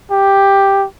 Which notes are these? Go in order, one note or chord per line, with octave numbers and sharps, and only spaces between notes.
G4